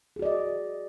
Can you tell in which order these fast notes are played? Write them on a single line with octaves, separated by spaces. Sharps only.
G#4 F#4 D5 D#5